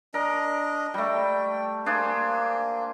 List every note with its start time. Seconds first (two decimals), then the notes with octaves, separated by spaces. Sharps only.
0.14 D4 A#4 D#5
0.94 G3 A3 G5
1.86 A#3 D4 G#4 C5